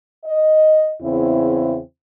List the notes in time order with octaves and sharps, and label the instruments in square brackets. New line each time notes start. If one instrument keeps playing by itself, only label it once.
[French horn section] D#5
E2 C#3 C4 E4